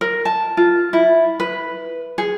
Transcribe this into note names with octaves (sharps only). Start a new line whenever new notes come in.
A#4
A5
F4
E4
B4
G#4